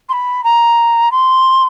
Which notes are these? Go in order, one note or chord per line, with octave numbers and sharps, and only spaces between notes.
C6
B5
A#5
C6